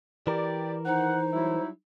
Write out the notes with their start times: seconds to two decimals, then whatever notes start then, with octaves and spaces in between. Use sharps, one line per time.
0.27 E3 G4 A#4 D5
0.86 D#3 D#4 C5 F#5
1.32 F#3 G3 E4